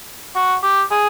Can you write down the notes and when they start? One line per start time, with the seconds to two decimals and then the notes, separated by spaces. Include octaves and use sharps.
0.36 F#4
0.63 G4
0.91 G#4